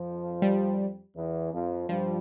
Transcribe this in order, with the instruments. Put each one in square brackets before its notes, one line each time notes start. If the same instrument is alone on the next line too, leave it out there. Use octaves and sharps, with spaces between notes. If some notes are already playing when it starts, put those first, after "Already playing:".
Already playing: [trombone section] F2 F3
[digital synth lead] G3
[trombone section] E2 E3
F2 F3
[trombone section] G2 G3 [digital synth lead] F3